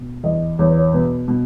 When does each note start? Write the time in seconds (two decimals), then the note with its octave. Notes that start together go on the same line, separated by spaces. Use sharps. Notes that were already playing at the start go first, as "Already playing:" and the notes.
Already playing: B2
0.23 E2 D#5
0.59 E2 C#5
0.69 B4
0.77 C#5
0.93 B2 B4
1.28 B2